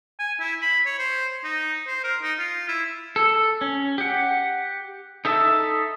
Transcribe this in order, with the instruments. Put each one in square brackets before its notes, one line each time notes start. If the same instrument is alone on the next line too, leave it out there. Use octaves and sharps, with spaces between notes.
[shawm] G#5
E4
B5
C#5
C5
D#4
C5
A#4
D#4
F4
E4
[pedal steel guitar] A4
C#4
G4 F#5
D#4 A4 E5 A5